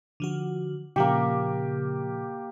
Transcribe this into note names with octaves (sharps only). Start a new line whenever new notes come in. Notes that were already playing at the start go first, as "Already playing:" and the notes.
D3 F3 F#4
A#2 C#3 F3 A#3 G4